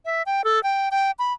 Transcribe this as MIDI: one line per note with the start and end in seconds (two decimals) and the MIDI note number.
0.05 0.22 76
0.26 0.44 79
0.44 0.62 69
0.63 0.89 79
0.91 1.11 79
1.19 1.33 83